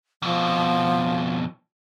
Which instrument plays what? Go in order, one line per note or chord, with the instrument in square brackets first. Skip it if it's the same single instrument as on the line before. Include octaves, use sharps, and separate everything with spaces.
[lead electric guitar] F2 B2 [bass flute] F3